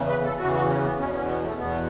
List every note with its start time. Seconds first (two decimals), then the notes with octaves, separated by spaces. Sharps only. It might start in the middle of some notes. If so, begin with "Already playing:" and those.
Already playing: E2 C#3 E3
0.08 B4
0.23 A4
0.38 E2 C#3 E3 F#4
0.54 F#4
0.68 C#4
0.83 B3
0.98 E2 B2 C#4
1.13 C#4
1.29 B3
1.43 A3
1.58 E2 B2 B3